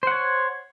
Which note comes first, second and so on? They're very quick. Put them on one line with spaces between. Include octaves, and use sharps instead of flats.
C5 F#5 C#5